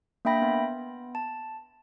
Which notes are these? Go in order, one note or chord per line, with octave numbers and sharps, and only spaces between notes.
A#3 D4 E5 G5 B5 A#6
B3
A5